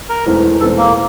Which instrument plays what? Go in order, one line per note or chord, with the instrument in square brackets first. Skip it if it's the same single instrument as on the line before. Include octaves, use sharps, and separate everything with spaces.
[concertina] A#4
[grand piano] E1 E2 E3 A3 C4
[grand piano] E1 E2 E3 A3 C4 [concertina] A4
[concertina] A#3